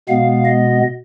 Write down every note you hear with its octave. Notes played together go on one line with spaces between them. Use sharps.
B2 G#3 B3 F5
D#5